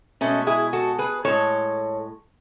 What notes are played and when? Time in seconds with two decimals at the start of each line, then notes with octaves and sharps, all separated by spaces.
0.21 B2 G#3 A3 C#4
0.47 E4 G#4
0.73 F#4 A4
0.98 G#4 B4
1.25 A2 G#3 A4 C#5